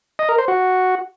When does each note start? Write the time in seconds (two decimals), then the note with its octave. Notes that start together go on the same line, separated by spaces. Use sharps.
0.19 D#5
0.29 A#4
0.38 C5
0.48 F#4